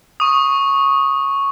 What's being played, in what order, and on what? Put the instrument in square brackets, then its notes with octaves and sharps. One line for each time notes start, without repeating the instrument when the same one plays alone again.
[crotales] C#6 D#6